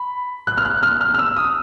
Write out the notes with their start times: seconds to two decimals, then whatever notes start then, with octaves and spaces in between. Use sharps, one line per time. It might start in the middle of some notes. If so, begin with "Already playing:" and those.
Already playing: B5
0.47 F#6
0.58 F6
0.65 F#6
0.83 F6
1.01 F6
1.14 F6
1.19 E6
1.36 D#6